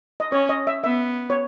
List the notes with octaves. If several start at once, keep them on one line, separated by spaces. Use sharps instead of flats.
D#5
C#4 C#5
D#5
E5
B3 E5
C#5